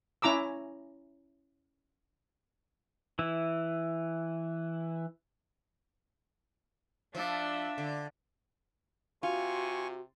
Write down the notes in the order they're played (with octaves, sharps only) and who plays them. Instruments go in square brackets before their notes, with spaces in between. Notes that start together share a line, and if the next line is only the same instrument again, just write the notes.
[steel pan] C#4 E4 A#5 D6 E6
[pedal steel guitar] E3 E4
[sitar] F3 [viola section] D4 E5
[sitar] D3
[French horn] C3 [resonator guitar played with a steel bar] F4 [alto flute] F#4 [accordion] G#5 C#6